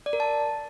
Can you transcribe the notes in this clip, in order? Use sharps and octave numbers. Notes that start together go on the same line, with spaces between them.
D5
A#4
A5